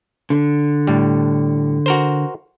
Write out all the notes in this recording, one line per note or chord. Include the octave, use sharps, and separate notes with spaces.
D3
A2 G3
F#4 A#4 C5